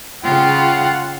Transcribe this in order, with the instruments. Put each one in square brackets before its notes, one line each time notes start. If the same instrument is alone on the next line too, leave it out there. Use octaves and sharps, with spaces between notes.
[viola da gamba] C#3 [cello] F4 [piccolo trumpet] F#5 [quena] G5